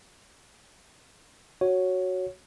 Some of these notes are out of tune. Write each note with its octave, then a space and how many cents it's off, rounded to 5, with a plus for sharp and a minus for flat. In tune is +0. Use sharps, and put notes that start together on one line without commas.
F#4 +0 C#5 +0